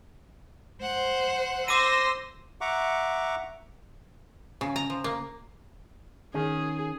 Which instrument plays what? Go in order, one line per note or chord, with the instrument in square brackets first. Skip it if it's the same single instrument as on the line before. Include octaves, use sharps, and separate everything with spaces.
[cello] C5 [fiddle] F#5
[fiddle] C5 [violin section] C6 E6 A#6 [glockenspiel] D6 D#7
[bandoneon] E5 F#5 A#5 C#6 D6
[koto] C#3
A#5
F3
A#3
[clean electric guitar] D#3 C#4 [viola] G#4